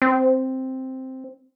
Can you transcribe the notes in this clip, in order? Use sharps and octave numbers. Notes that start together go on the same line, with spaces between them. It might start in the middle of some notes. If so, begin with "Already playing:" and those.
C4